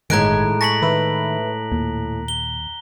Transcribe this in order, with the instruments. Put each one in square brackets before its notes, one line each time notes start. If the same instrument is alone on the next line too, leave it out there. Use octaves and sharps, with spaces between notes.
[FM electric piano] G1 G#6 [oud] A2 G#3 [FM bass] D#3 [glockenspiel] A#5 F#6 D7
[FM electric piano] G#5 A5 C#6 [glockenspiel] A#6 B6 F#7
[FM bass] D#3 [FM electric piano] B4 E5
[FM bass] D#2 [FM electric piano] A#2
[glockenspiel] G7